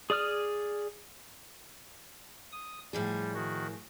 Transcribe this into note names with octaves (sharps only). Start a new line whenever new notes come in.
G#4 D5 D#6 F6
D#6
A2 F3 G3 G#4
D#3 F#4